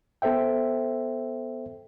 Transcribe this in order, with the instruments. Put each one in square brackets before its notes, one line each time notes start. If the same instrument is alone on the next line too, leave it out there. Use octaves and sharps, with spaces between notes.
[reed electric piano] B3 A4 C5 E5 G5